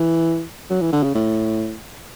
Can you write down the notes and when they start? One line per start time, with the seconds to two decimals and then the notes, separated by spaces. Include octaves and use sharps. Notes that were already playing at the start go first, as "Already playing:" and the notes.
Already playing: E3
0.70 F#3
0.81 E3
0.92 D3
1.03 C#3
1.15 A2